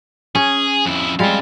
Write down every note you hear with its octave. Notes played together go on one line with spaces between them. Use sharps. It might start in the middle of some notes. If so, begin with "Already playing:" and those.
C#4 G#4
F2 E4
G3 G#3 C4 F5